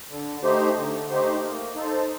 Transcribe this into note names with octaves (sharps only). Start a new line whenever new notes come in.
D3
A3 D#4 G4 C5
D3
A3 D#4 G4 C5
A#3
D#4 A4 C5